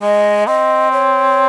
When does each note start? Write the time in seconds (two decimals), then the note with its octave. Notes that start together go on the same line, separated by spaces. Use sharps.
0.02 G#3 D#5
0.47 C4 D#5
0.92 C#5